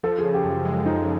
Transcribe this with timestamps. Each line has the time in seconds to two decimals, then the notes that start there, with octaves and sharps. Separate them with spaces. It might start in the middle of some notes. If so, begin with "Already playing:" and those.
0.03 F3 A4
0.18 G#4
0.24 C#3
0.34 G4
0.44 F#2
0.65 G#3
0.86 F3 D#4